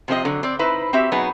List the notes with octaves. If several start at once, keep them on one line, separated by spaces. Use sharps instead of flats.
C3 F3 C4 G#4 D#5
D3 F#3
C4 D5
D#4 E4 B4 C5
C4 F#4 G4 E5
B2 F#3 B3 D#4 G#4